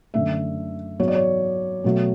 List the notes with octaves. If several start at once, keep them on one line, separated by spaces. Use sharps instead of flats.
F#2 D3 A3 E5
G#2 F#3 B3 C#5
D5
C#5
B2 F#3 A3